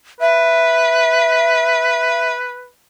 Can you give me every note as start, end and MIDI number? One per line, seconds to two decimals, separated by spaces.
0.21 2.68 71
0.21 2.30 76